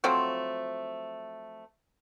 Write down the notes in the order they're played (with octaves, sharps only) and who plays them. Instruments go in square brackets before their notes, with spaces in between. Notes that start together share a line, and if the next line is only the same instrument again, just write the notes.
[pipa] F3 F#3 A3 C4